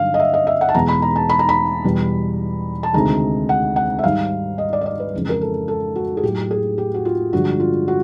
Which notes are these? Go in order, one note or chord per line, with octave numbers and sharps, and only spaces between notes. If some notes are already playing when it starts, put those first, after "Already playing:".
Already playing: G2 D3 F#3 F5
D#5
E5
D#5
E5
F#5
A5
E2 B2 G#3 A#5
B5
A#5
A5
B5
A#5
B5
E2 B2 G3
A5
D2 C3 D#3 G#3 A#5
F#5
F#5
E5
G#2 D#3 G3 F5
D#5
D5
D#5
D5
B4
F2 C#3 E3 G#3
A#4
A4
A4
F#4
G#4
A2 F#3 A3 G4
G#4
G4
F#4
F4
G2 D3 F3 G#3 F#4
F4
F#4